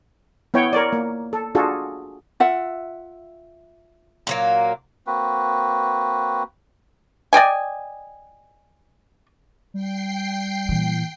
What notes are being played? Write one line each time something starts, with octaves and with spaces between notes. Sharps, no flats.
B3 E4 C#5 G5
A#4 C#5 D5
A#3
A4
D4 F4 F#4 G#4 A4
F4 E5 F#5
A#2 F#3 A#3
A#3 C4 F#4 B4
D5 D#5 G5 G#5
G3 G5 C7
A#2 E3